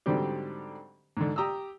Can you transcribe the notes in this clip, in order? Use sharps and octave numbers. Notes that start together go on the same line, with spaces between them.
G#2 D3 F#3 G3 C4 G4
G#2 D3
G4 A#5 D#6 E6